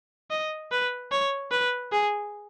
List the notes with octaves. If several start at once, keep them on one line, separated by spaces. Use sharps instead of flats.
D#5
B4
C#5
B4
G#4